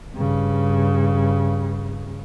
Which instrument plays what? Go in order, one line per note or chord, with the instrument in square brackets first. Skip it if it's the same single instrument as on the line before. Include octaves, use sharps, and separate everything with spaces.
[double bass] G2 C#3